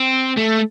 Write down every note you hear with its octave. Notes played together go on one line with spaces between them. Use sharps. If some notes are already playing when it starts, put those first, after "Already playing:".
Already playing: C4
A3